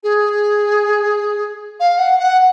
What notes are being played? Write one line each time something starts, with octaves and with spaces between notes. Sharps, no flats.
G#4
F5
F#5
F#5